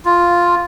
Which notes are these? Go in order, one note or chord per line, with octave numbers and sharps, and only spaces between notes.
F4